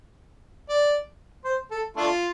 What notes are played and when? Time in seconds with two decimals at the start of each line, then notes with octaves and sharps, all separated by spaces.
0.69 D5
1.44 C5
1.71 A4
1.97 A3 D4 F4